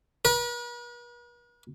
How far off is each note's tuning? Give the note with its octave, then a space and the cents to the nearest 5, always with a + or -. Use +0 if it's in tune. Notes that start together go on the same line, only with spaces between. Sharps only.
B4 -45